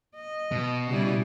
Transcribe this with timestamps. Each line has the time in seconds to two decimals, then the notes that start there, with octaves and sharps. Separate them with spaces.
0.16 D#5
0.52 B2
0.88 C#3 G3 E4